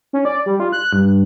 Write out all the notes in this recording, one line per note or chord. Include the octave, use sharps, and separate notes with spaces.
C#4
D5
G3
F4
F#6
G2